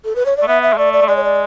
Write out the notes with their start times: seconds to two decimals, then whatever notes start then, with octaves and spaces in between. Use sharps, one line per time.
0.05 A4
0.16 B4
0.25 C#5
0.37 A3 D5
0.47 B3 E5
0.62 E5
0.73 G#3
0.78 A3 D5
0.93 D5
1.01 A3
1.08 G#3 D5
1.16 C#5
1.24 D5